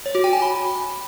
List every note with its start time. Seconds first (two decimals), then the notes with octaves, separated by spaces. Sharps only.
0.06 C#5
0.15 F#4
0.24 G5
0.33 G#5
0.42 B5